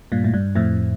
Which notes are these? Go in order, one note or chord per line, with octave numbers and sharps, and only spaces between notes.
G2 A#2
A2
G2
F2 A2